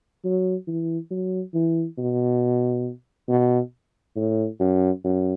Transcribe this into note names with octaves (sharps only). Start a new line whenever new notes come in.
F#3
E3
F#3
E3
B2
B2
A2
F#2
F#2